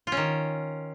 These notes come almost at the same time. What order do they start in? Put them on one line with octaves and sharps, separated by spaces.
F4 C#4 D#3